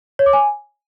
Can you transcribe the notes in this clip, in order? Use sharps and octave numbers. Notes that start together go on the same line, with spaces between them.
C#5
D6
G#5